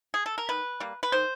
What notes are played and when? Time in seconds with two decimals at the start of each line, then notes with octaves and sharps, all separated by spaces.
0.14 G#4
0.26 A4
0.38 A#4
0.49 D#3 B4
0.80 G3 A#3
1.03 B4
1.12 D#3 C5